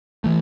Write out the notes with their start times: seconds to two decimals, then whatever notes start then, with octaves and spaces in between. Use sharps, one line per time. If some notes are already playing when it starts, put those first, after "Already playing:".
0.24 E3 A3